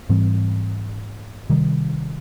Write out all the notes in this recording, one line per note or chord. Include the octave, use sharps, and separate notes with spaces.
G#2 E3 G3 C4
C3 D#3 G3